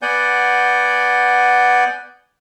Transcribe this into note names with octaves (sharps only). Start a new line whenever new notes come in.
B3 D5 F#5 G#5 G6